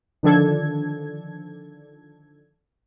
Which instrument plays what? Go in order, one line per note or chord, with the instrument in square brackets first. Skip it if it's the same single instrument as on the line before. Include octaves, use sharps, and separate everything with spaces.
[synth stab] D3 D#3 F3 D4 A4 G#6